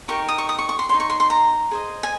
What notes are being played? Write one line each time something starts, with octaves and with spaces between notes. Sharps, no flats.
D#4 G4 A#4 C#6
D#6
C#6
D#6
C#6
C#6
C6
D#4 G#4 C#5 C6
C#6
C6
C6
A#5
G#4 C5 D#5
G#5